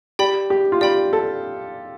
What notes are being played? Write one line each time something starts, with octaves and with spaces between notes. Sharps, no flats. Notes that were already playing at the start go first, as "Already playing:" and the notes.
G4 D5 G5 B5
G4
F4
G4 D5 G5 B5
A4